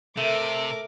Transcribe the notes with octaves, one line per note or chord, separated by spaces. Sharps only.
C3 A3 A#4 D6